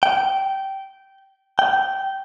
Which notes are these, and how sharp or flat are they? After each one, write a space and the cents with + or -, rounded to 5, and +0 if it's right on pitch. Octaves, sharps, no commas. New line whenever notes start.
G5 -15
G5 -15